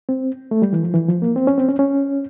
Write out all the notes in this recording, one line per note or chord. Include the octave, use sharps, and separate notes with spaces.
C4
A3
G3
E3
F3
E3
F3
A#3
C4
C#4
C4
C#4
C#4